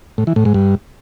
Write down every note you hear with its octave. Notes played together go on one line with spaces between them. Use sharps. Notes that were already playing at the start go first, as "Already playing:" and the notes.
A2
E3
A2
G#2
G2